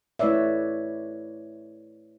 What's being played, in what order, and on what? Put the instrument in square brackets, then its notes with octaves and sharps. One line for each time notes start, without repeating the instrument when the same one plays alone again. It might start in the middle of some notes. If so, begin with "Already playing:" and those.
[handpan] A3 E4 B4 C#5 D5 E5